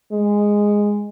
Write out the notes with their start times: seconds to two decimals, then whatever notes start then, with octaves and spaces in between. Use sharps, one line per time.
0.12 G#3